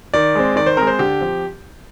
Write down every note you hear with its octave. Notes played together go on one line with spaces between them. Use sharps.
D#3 D5
G#3 C4
D#3 D5
C5
G#3 C4 A#4
C5
D3 G4
F3 C4